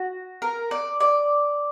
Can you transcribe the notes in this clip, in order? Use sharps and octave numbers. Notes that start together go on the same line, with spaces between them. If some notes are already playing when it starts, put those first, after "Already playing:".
Already playing: F#4
A#4
D5
D5